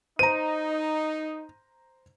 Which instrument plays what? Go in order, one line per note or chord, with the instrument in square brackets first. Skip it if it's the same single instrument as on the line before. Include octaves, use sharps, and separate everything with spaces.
[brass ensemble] D#4 [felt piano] C5 A#5 [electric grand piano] D#7